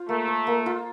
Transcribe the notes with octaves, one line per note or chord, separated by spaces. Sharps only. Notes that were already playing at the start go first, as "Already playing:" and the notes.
Already playing: F4 C5
A3 A#3
C5
A#3
F4